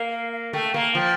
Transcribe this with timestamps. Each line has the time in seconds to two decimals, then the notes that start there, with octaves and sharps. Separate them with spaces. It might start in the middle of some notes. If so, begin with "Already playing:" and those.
Already playing: A#3
0.12 F5
0.33 F5
0.53 A3 G5
0.74 A#3 F5
0.95 F3 G5